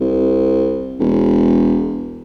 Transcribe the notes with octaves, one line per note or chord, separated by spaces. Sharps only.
C2
E1